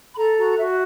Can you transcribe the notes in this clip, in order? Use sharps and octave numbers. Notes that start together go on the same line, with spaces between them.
B5
A4 A#5
F#4 A#5
F#4 E5